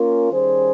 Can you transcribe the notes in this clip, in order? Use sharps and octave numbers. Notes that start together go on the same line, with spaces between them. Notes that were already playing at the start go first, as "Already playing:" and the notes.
Already playing: A#3 C#4 F4 A#4
D#3 G3 C#4 G#4 C5